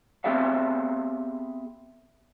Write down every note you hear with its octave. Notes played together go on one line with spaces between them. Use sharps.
B3 C4 G4 G#4 E5 F5